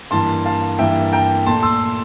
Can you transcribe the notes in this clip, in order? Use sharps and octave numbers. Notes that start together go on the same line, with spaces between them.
G2 E3 A#3 A5 C6
F5 A5
G2 E3 A#3 E5 G5
G5 A#5
A#2 A3 A5 C6
C6 E6